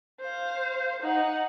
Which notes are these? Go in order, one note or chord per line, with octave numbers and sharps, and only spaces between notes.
C5 F5
D#4 F#5